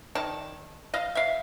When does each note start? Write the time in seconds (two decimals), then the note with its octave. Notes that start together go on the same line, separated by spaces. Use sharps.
0.15 D#3 D5 A5
0.94 D#5 F5
1.15 E5 F5